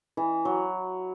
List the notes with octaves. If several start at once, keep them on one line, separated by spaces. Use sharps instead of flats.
E3
F#3